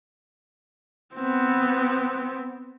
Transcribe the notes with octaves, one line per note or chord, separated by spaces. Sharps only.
B3 C4